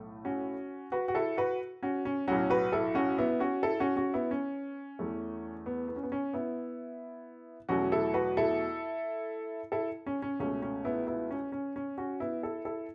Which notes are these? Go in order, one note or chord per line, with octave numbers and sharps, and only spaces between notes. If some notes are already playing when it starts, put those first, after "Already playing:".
Already playing: B1 A2 A3
C#4 F#4
F#4 B4
F#4
E4 A4
F#4 B4
C#4 F#4
C#4
B1 A2 F#3 C#4 F#4
F#4 B4
E4 A4
C#4 F#4
B3 E4
C#4 F#4
E4 A4
C#4 F#4
C#4 F#4
B3 E4
C#4
E2 E3 A3
B3
B3
C#4
B3
C#4
B3 E4
E2 B2 F#3 A3 C#4 F#4
E4 A4
F#4 B4
E4 A4
E4 A4
C#4
C#4
C#2 B2 A3 C#4
C#4
B3 E4
B3 E4
C#4
C#4
C#4
C#4 F#4
B3 E4
E4 A4
E4 A4